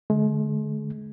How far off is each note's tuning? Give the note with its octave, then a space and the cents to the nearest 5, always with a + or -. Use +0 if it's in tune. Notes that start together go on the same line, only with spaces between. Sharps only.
D3 +0 G#3 +40